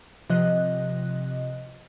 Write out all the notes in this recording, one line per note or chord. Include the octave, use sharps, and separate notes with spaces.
C3 F3 D#5 F#6